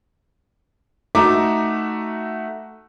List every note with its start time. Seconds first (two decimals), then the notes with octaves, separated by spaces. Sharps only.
1.15 A3 D#4 F#4 E5 A#5 D6